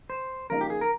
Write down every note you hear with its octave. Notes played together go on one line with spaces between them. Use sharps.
C5
C#3 F3 A#3 D#4 A#4
G4
G#4
A#4